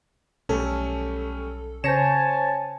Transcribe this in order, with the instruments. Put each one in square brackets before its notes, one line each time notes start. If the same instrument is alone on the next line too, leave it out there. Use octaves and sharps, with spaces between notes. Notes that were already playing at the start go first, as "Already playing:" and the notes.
[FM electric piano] B1 A4 [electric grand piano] G3 A3 C#4
[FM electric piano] C#3 [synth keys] C5 C#5 [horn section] G#5 A5 [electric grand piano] A#6 C#7 E7